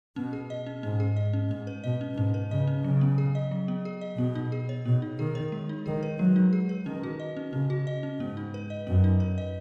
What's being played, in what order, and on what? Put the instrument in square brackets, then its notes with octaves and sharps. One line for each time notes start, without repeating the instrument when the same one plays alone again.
[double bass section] B2 [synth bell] C#4
[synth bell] G#4
D#5
C#4
[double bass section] G#2 [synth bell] C#4
[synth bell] G#4
D#5
C#4
[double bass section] G#2 [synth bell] C#4
[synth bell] B4
[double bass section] B2 [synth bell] D#5
[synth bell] C#4
[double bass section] G#2 [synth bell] C#4
[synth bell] B4
[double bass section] C#3 [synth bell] D#5
[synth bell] C#4
[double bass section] C#3 [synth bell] F#3
[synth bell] B3
G#4
D#5
F#3
B3
G#4
D#5
[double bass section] B2 [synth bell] B3
[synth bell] D#4
G#4
C#5
[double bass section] B2 [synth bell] B3
[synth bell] D#4
[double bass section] D#3 [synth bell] G#4
[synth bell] C#5
G#3
D#4
[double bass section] D#3 [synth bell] G#4
[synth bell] B4
[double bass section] F#3 [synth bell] G#3
[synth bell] D#4
G#4
B4
[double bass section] D#3 [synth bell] C#4
[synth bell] F#4
D#5
C#4
[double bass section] C#3 [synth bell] C#4
[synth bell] F#4
D#5
C#4
[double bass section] G#2 [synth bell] B3
[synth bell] D#4
B4
D#5
[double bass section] F#2 [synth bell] B3
[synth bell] D#4
B4
D#5